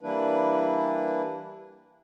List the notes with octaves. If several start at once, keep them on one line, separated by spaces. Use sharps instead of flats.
E3 G3 A#3 D4 E4 B4